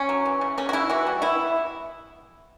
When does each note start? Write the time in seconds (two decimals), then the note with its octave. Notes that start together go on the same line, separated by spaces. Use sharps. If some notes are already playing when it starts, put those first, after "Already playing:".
Already playing: C#4
0.09 F#3
0.25 E3
0.41 C#3
0.58 C#3 C#4
0.69 F#4
0.73 C#3 E4
0.90 E3 F#4
1.07 G3
1.22 B3 E4